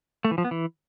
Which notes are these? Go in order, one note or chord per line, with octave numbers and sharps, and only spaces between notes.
A3
E3
F3
B3
E3